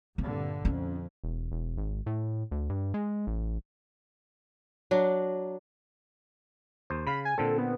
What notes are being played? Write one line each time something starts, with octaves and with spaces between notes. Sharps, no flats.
G2 A#2 D3 C4
F2 C#4
E1
E1
G#1
A2
D2
G2
G#3
A1
F#3 D4
D#2 C5
C#3 F5 B5
G#5
A#2 D3 C4 A4
B3